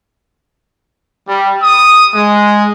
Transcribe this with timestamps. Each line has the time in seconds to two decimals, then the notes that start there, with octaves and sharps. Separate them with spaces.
1.28 G3
1.63 D#6
2.14 G#3